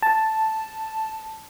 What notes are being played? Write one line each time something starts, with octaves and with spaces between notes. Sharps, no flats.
A5